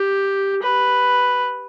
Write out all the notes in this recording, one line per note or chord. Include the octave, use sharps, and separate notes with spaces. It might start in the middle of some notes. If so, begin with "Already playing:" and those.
Already playing: G4
B4